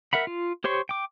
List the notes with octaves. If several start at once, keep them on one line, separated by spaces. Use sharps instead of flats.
A#4 E5 F#5 B5
F4
G4 C5 C#5 C6 C#6
G5 D6